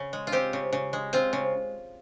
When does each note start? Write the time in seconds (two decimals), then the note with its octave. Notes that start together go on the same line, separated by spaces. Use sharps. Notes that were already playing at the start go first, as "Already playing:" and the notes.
Already playing: C#3
0.13 G#3
0.27 F4
0.32 C4 G4
0.53 C#3
0.73 C#3
0.93 G#3
1.13 C4 F4
1.33 C#3